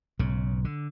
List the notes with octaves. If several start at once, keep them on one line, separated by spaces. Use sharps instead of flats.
B1 G#2 C#3
D3